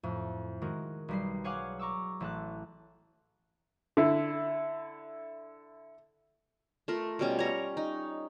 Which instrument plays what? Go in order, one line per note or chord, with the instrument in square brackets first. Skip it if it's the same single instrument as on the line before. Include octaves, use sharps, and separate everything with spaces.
[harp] F2 A2
D#3 G#3 F#4 A#4
B1 G3 C7
G#4 C#5 F5 F#5 G#5 D6
A#5 C#6 D6 E6
A1 A5 F#6
[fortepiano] D3 E4
[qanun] A3 F4 A#4
B2 G3 C#4
C#5 A#5
D#4